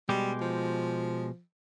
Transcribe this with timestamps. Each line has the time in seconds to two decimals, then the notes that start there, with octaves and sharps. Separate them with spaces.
0.09 B2 G3 G#3 G4
0.41 F3